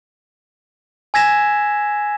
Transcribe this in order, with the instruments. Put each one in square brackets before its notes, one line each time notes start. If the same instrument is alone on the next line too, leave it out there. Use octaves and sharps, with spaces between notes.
[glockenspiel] G#5 E6 G#6 A#6 B6 E7